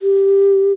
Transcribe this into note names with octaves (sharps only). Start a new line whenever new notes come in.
G4